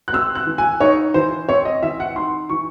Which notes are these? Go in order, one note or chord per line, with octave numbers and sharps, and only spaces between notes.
F#6
C4 E6
F#6
E3
G#5
D#4 C#5
E3 C5
C4 C#5
D#5
E3 E5
F#5
D#4 C6
E3 C#6